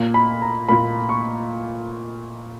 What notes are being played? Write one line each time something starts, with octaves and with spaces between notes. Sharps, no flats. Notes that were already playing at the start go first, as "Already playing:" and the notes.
Already playing: A#2 A#3
B5
A#5
A#2 A#3 B5
C#6